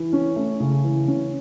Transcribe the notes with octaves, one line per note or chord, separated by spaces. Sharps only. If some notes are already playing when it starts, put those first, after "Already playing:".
Already playing: E3
C#4
A3
C#3
E3
C#4